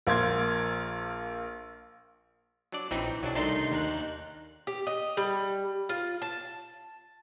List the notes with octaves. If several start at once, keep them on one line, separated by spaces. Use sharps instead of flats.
A#1 A#3 C6 G#6
F#3 D4 D5
A#1 E3 C4 D#4
B1 F#3 D4
C2 D#3 A3 D4 D#4 C6
D#2 D#4 F#6
G4
D#5
G3
F4
A5